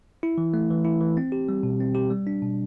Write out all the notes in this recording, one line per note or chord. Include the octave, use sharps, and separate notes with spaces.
E4
E3
A3
E3
E4
E3
C4
G4
G3
B2
C4
G4
G3
D4
B2